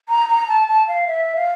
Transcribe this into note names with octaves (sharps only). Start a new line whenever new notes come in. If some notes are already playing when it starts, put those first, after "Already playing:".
A#5
A#5
A5
A5
F5
E5
F5